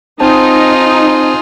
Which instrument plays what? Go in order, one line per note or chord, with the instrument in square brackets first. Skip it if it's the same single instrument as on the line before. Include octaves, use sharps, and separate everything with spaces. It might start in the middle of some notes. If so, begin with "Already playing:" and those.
[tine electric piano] C4 C5 A5 [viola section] D#4 [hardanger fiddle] F4 G#4